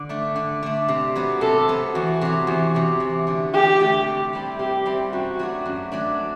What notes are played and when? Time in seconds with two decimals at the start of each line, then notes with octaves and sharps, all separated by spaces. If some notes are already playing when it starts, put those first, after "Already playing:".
Already playing: D3
0.09 A3 D4
0.36 D3
0.63 A3 D4
0.88 C3
1.16 F#3 B3
1.41 C3 A4
1.68 F#3 B3
1.94 E2 F#4
2.21 C3 F#3
2.47 E2 F#4
2.75 C3 F#3
3.00 E2
3.27 D3 A3
3.54 E2 G4
3.80 D3 A3
4.06 C3
4.33 G3 C4 E4
4.59 C3 G4
4.86 G3 C4 E4
5.12 F#2 F#4
5.39 F#3 A3 D4
5.65 F#2
5.92 F#3 A3 D4